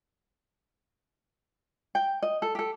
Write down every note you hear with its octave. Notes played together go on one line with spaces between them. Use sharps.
G5
D#5
A4
G4 A4